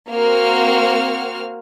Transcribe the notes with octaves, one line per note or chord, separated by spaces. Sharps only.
A#3 C4 F#4 F6